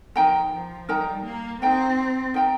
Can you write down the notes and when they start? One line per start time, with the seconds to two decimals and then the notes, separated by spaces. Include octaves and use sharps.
0.15 F3 D#4 A#4 G5 A#5
0.52 F3
0.88 G3 D#4 A#4 G5 A#5
1.25 A#3
1.62 C4 D#4 A#4 G5 A#5
2.34 D#4 A#4 G5 A#5